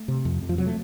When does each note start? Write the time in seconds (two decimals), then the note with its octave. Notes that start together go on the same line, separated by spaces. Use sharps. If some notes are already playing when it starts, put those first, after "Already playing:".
Already playing: A3
0.08 C3
0.25 F2
0.42 F2
0.49 F3
0.58 C3 F#3
0.67 A3